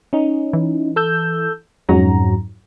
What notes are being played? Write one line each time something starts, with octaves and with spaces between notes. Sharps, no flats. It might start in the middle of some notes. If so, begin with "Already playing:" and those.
C#4 D#4
E3
A4 E6 G6
F2 G#2 F#3 C#4 F#4 A#5